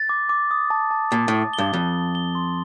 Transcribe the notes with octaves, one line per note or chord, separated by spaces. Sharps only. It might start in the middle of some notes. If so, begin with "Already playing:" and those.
Already playing: A6
D6
D6
D#6
A5
A5
A#2 A6
A2 D6
G7
G2
F2 A6
D#6
G7
C6